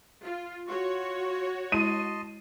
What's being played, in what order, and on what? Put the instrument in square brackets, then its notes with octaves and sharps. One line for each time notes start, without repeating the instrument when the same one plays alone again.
[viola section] F4
[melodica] F4 C#6 [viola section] F#4 C#5
[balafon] G#3 E4 [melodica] D#5 A5 C6 [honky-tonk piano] D#7